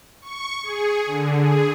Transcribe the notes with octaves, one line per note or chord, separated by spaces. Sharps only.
C#6
G#4
D3
G#4